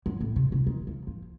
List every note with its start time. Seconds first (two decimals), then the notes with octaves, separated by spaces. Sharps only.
0.06 F#2
0.20 A2
0.36 C3
0.52 C3
0.67 D#3
0.87 F3
1.07 F3